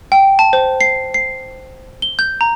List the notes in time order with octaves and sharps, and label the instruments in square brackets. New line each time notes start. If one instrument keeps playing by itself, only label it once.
[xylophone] G5
A5
C5
C7
C7
G7
G6
A#5